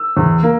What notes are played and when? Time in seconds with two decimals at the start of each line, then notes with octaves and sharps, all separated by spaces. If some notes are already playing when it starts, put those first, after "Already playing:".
Already playing: E6
0.17 E2
0.43 A#3